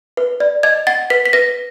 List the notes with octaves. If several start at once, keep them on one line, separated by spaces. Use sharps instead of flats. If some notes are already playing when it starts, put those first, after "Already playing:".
B4
D5
D#5 G#6
F#5 A6
B4 B6
B6
B4 A#6